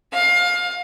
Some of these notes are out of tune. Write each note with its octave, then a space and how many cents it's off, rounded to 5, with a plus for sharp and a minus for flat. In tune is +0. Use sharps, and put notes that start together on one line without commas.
F5 +25